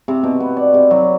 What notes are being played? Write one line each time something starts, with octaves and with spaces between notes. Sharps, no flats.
C3
B2
B3
D5
C3
F#3